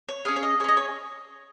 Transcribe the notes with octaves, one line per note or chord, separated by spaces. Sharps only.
C#5
C#4 G#4 F5
C#5
D#5
C#4 G#4 C#5 D#5
C#5